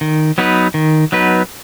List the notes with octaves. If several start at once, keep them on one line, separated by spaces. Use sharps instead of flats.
D#3
F#3 B3 D#4 B4
D#3
F#3 B3 D#4 B4